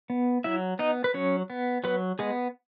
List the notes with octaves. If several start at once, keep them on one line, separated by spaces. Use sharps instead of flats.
B3
F#3 E4 E5
B3 D#4 D#5
B4
F#3 C#4 C#5
B3
F#3 B3 B4
G#3 B3 G#4